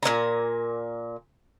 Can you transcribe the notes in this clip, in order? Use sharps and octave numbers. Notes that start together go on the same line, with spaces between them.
A#2 C#4 G#5 A#5